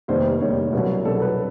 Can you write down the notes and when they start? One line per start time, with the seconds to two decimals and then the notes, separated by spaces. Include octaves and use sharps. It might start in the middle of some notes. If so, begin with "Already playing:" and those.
0.08 F1 D#2 D#3 G3 C5
0.40 F1 D#2 D#3 G3 C#5
0.73 C2 B2 F#3
1.05 C2 B2 F#3 A4
1.22 B4